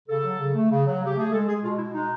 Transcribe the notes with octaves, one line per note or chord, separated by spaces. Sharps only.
C#3 A4
F#3
C#3
A3
C#3
F#3
C#3 G4
A3 G#4
G#3 A4
G#3 G#4
B2 F4
B2 E4
G#3 D#4